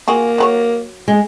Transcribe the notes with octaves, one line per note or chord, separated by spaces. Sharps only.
A#3 F4 F#4 G#4
F#3 B4 C#5
G#3